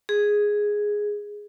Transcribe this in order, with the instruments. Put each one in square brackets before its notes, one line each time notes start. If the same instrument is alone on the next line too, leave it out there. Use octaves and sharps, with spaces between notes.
[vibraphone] G#4